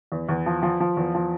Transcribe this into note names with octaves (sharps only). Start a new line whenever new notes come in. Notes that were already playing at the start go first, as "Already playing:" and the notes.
E2
E2
F3
F3
F3
E2
F3